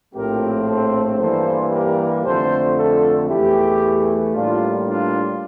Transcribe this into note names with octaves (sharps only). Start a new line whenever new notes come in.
A#1 A2 F3 A3 C4 G4 A#4
A4 C5
G2 E3 G3 A#3 A4 C5
G4 A#4
F2 D3 A3 A4 C5
F4 A4
E2 E3 A3 E4 G4
A2 G3 A#3 D4 F4
D4 F4